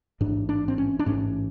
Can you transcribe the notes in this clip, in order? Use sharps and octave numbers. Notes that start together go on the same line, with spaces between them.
A1 G#2 D4
D4
C4
C#4
D4
A1 G#2 C#4